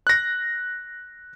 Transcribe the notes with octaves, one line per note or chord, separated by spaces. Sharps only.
F#6 A#6